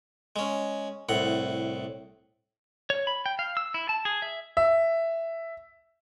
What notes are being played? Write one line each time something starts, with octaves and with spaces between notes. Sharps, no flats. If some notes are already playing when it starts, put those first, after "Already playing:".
G#3 C#4
C2 A2 F#5
C#5
B5
G5
F5
E6
E4
A5
G#4
E5
E5